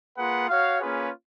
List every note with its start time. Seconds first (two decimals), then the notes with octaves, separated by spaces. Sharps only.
0.17 A#3 F4 G#4 B4 F#5
0.48 F#4 C#5 F5
0.80 A#3 C#4 F4 G#4 B4